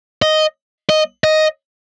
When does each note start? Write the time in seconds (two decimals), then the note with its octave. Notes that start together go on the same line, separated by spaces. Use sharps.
0.22 D#5
0.89 D#5
1.24 D#5